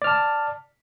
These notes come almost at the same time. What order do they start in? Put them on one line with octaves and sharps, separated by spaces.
D5 F6 A5